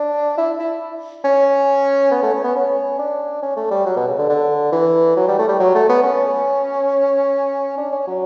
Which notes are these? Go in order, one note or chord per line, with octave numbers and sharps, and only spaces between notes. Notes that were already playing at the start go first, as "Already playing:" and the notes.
Already playing: D4
E4
E4
C#4
B3
A3
C#4
B3
C#4
D4
C#4
A3
G3
F#3
B2
C#3
D3
D3
E3
F#3
G3
A3
G3
F#3
A3
B3
C#4
D4
C#4
F#3